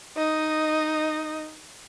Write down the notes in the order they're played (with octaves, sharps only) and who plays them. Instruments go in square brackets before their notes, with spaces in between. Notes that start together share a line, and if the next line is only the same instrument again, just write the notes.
[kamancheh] D#4 D#5